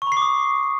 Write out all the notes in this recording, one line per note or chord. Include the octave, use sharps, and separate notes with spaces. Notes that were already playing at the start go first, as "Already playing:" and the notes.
C#6
B5
C7
D6
D#6